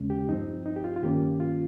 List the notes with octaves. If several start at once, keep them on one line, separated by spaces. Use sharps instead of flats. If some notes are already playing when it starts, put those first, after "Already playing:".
Already playing: D#2 C#3 G#3 C#4
G4
G2 F3 C4 D#4
D#4
G4
F4
F4
G2 D#3 A#3 C#4 G4
F4